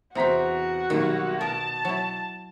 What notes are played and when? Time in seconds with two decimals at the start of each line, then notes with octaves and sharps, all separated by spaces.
0.15 E2 C3 C4 F#4 A#5 B6
0.90 B1 D#3 G3 A#3
1.41 B2 A#4 A5
1.85 F#3 E4